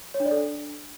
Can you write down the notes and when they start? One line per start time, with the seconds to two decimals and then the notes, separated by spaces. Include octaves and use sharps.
0.14 C#5
0.20 D4
0.26 D5
0.31 A4
0.37 D4